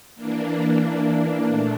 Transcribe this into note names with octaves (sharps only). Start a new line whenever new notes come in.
E3 A#3 D4
E3 A#3 D4
A#2 A3 D4